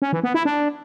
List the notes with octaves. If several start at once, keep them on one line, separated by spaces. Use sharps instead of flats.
C#4
E3
B3
E4
D4